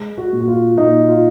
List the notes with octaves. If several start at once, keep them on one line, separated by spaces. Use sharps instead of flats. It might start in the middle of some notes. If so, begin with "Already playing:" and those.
Already playing: G#3
F#4
A#2
F#4
F4
A#2 D#4
F4